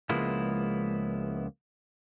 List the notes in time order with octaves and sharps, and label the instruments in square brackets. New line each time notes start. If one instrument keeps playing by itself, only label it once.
[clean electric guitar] C#2 F3 G#3 A#3 B3 E4